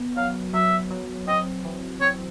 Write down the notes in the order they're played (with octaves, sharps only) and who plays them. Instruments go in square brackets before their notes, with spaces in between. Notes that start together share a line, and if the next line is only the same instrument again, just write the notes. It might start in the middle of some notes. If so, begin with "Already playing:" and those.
Already playing: [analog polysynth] B3
[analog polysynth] F#3 [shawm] F5
[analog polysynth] F#3 [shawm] E5
[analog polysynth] F#3
[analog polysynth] C4 [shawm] D#5
[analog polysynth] E3
[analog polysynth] C4 [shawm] C#5